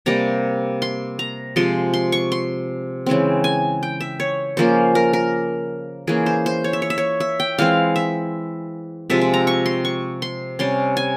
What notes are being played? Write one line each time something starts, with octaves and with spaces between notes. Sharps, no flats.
C3 G3 A#3 A#5
C6
A#5
C3 F3 G#3 C6
C6
C#6
C6
C#3 E3 G#3 C4
G#5
G5
E5
C#5
C#3 F3 A#3 C#4 C5
A#4
A#4
E3 A#3 C#4 G#4
C5
C5
C#5
E5
C#5
E5
C#5
E5
G5
E3 G#3 C4 F5
E5
C3 F3 G#3 C4 E5
E5
A#5
C#6
C6
C#6
C6
C3 G3 C#4 C6
G#5